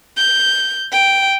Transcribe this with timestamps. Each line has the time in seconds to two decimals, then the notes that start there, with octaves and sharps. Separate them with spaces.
0.17 G6
0.92 G5